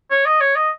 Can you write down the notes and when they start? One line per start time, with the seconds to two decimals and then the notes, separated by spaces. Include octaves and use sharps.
0.10 C#5
0.25 D#5
0.40 C#5
0.55 D#5